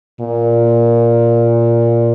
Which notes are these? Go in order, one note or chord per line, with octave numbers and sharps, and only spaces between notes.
A#2